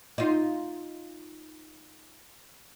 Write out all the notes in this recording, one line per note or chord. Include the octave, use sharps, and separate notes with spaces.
D#4 F4